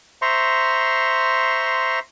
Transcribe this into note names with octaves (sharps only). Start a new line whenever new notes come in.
C5 E5 A#5 C6 C#6